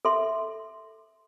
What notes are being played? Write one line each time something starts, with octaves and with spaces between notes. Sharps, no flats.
A4 E5 C6